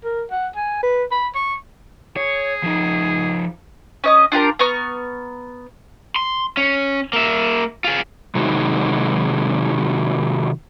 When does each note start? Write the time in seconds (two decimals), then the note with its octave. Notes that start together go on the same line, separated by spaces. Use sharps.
0.04 A#4
0.31 F#5
0.56 G#5
0.83 B4
1.11 B5
1.35 C#6
2.17 G#4 C#5
2.63 F3 D#4
4.04 C#4 D#5 D#6
4.32 D4 F4 G4 A#4
4.59 B3 A#5 C#6 F6
6.16 C6
6.57 C#4
7.13 A#3 E5
7.84 F4 G#4
8.35 C3 D#3 F#3 G#3 D#4 F#4